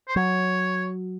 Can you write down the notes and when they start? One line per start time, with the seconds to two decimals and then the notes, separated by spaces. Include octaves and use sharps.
0.08 C5
0.16 F#3 C#5